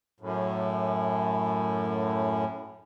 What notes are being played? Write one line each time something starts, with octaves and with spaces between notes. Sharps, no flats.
F#2 A2